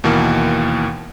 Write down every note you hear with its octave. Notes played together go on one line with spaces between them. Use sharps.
D#2 B2 E3 A#3